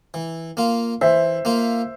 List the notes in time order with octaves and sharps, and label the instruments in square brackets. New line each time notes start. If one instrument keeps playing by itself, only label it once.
[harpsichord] E3
A#3 F4
[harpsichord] E3 [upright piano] C5 E5
[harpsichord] A#3 F4